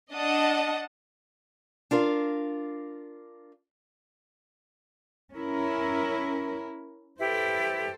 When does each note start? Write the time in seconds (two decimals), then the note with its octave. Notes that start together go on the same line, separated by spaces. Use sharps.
0.13 D4 D#5 F#5 A5 D#6
1.91 D4 F4 A#4 F5
5.34 C#4 E4 A#4
7.19 E4 G4 A4 B4 C5